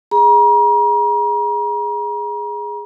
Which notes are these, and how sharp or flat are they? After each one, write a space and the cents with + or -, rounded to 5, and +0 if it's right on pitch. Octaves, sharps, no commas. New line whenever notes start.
G#4 +0 A#5 +35